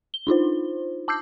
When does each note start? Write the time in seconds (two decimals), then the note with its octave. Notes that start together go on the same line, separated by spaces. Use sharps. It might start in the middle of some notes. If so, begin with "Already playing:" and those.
0.14 G7
0.27 D4 D#4 F4 C5
1.08 A5 D6 E6 G6 C7